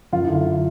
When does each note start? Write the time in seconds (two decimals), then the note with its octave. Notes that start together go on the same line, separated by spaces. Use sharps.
0.12 F#2 F4
0.24 E4
0.29 D3
0.34 F4